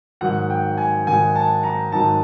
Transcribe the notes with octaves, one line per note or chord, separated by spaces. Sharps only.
G#2 D#3 F#3 F#5
G5
G#5
G#2 D#3 F#3 G#5
A5
A#5
G#2 D#3 F#3 A5